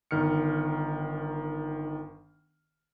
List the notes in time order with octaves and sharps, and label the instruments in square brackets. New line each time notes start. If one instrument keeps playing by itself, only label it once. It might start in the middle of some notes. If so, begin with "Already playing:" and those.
[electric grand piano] G1 D#3 F6 C#7